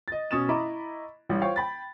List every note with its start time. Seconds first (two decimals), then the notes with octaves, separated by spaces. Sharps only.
0.08 D#5 A6
0.31 B2 C#4 D#6 A6 E7
0.49 E4 D#5 A#5 B5 C#6 D6
1.29 A1 E3 G3
1.41 F4 C5 C#5 F5 G5 C#6
1.56 G5 B5 A6